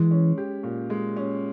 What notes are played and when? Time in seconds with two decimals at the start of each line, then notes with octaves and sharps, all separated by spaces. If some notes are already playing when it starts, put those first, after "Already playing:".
Already playing: E3 G#3
0.11 C#4
0.38 G4
0.63 A#2
0.90 G#3
1.16 C#4